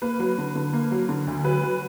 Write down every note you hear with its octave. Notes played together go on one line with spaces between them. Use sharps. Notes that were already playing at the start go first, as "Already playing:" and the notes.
A#3 B4
F#3
D3
D3
A#3
F#3
D3
D2
F#3 B4
F#3